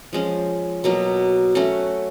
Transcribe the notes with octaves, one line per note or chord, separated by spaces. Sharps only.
F3 G#3 C#4
B2 F#3 A#3
A3 C#4 F#4